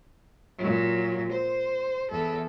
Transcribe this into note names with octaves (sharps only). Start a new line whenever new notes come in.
A#2 F#3
C5
E2 A4